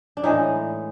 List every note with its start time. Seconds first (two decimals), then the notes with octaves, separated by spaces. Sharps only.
0.17 D4
0.23 A2 E3 G#3 D#4